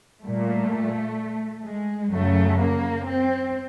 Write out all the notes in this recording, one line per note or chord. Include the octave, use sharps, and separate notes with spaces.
A#2 G3 A3
G#3
F#2 C#3 F#3 A3
A#3
C4